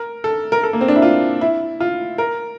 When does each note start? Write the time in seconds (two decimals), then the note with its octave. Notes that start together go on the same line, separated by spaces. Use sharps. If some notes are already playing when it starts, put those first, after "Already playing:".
Already playing: A#4
0.24 A4
0.52 A#4
0.63 A4
0.73 A#3
0.81 C4
0.88 D4
0.95 E4
1.02 F4
1.41 E4
1.80 F4
2.18 A#4